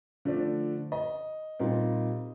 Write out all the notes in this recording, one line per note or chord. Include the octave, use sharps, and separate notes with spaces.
D3 F3 A3 D4
D#5
A#2 G3 C4 D#4